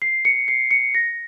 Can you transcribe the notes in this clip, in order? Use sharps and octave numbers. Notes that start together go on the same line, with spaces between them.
C7
C#7
C7
C#7
A#6